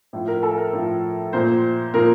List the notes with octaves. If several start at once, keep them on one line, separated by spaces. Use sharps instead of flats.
A2 F3
A#4
A4
A#4
A2 F3
A#2 F3 C5
A#2 F3 A#4